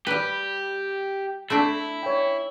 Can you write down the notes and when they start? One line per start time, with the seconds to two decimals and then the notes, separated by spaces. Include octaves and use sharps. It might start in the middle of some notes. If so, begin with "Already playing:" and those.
0.07 G3 G4 B4
1.50 A3 C4 D4 E4
2.03 C#5 G5